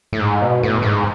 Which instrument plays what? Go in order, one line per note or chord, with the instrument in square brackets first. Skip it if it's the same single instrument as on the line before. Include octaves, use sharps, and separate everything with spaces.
[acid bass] A2
G#2
B2
A2
A2
G#2